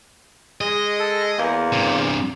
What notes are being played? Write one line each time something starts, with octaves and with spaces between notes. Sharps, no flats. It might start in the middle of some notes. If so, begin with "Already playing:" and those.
G#3 D#5
A4
E2 A#3
G2 C3